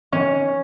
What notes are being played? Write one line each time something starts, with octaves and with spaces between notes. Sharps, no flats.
C#4